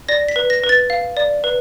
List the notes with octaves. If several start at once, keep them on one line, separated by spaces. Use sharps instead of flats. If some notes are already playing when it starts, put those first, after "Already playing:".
D5 A#6
B6
B4
A#6
B4
A6
F5
D5
B4